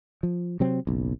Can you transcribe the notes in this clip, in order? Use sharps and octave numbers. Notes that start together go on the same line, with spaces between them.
F3
C3 F#3 C4
F#1 B1